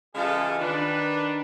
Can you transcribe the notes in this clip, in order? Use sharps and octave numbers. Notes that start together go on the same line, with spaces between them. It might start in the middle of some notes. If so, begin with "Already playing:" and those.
C#3 E3 G#3 F4 G4 A4
D#3 D4 B4